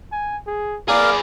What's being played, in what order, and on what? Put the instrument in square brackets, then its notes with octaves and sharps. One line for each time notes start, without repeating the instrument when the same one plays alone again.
[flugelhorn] G#5
G#4
[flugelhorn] A#3 [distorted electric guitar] G#4 B4 [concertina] A#4 F5 [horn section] D5